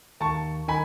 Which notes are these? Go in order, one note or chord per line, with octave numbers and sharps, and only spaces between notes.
D#2 A5 C#6
D#3 G#5 B5